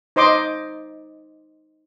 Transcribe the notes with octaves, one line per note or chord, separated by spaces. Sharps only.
D#4 C5 D#5 C6 D6